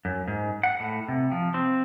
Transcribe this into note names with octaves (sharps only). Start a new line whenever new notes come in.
F#2
G#2
F#5
A2
C3
F3
C4